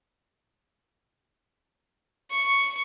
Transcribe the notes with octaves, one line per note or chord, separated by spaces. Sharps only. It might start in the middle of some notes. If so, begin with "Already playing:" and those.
C#6